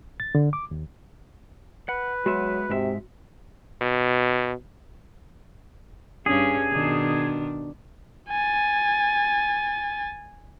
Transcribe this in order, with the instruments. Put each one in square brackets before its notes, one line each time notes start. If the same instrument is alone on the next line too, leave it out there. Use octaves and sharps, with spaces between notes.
[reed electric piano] A6
D3
D6
D#2
[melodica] B4 [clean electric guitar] F#5
[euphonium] F#3 [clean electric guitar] G#3 B3 E5 [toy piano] F#4
[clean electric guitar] G#2 G#3 E5 [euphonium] C3
[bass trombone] B2
[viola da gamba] G2 C#4 D4 [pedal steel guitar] G#4
[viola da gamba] B2 D#3 D4
[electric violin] G#5 A6